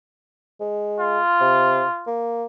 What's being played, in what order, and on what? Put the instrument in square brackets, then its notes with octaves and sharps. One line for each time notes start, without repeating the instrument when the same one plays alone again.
[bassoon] G#3
[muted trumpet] F4
[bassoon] C3
A#3